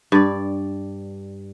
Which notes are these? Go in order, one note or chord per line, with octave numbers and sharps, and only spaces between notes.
G2 D5